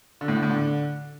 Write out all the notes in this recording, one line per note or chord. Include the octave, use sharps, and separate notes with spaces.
D3
A2
D3
A2
D3